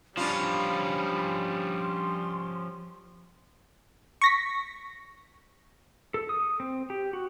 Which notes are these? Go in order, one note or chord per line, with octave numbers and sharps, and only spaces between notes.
F3 G3 C#4 D4 F4 B5
C6
C#6 A#6 B6
A4
D#6
C4
G4
F#4